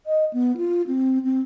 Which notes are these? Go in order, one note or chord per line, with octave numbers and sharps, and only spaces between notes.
D#5
B3
F4
C4
C4